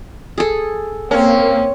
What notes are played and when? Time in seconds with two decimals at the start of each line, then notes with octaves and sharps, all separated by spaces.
0.38 G#4 A4
1.11 A#3 C4 C#4